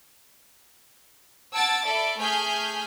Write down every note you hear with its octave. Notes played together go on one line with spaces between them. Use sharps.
F#5 A5 E6 G#6 A6 D7
A4 D5 E5 B5 D7
A3 G#4 G#5 F6 G6 B6